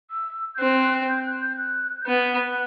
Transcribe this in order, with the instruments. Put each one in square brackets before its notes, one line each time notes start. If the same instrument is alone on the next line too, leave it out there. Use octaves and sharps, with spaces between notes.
[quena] E6
G6
[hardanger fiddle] C4 [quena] F#6
[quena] G6
F#6
G6
F#6
G6
[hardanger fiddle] B3 [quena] F#6